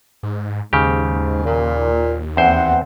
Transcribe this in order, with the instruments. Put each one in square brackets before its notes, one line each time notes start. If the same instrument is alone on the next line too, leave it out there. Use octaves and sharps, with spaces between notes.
[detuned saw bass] G#2
[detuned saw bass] D#2 [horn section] G#2 [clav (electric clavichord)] C#3 G4
[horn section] A#2
[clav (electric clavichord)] E2 C5 [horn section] C4 F#5